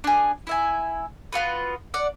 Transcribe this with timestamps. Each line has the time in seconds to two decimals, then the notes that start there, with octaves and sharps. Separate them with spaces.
0.04 D4 G#4
0.47 E4 E5 G#5
1.32 B3 F4 F#4 B4
1.94 D5 F#5